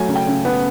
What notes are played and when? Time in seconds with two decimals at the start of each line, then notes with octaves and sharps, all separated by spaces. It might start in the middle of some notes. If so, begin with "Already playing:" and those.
Already playing: F#3 A3 G#5
0.08 C#3
0.15 G5
0.27 C#3
0.45 B3